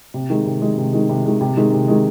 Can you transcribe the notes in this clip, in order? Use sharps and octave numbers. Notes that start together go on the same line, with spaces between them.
C3
D#3 G#3
C3
D#3 G#3
C3
D#3 G#3
C3
D#3 G#3
C3
D#3 G#3
C3
D#3 G#3